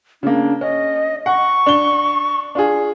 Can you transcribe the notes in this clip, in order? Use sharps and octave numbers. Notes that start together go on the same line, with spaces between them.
C#3 A#3 D4
C#4 D#5
F#5 C#6
D4 G7
D4 F4 G#4